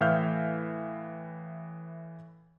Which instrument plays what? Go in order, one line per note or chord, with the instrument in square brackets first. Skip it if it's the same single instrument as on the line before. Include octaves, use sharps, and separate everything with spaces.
[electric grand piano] A2 E3 E5 F5 F6 G6